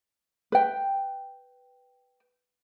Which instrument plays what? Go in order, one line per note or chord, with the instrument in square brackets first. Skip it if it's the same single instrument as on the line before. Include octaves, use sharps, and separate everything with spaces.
[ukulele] B4 G5